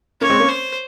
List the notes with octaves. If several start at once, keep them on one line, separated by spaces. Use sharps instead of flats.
A#3 C#4 C#5
G#3 C4
A#3 C#4
C5